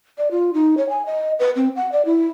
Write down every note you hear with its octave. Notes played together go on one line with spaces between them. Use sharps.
D5
F4
D#4
C#5
G#5
D#5
B4
C4
F#5
D5
E4